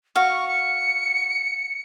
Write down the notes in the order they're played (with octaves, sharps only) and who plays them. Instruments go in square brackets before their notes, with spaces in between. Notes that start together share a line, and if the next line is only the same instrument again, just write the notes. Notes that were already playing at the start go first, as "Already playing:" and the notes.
[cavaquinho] F#4 F5 [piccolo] C#6
[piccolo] C#7